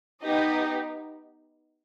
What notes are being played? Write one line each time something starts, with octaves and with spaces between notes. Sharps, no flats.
B3 D#4 G4 D#5